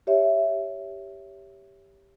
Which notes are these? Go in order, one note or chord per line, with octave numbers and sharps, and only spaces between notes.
G4 C#5 E5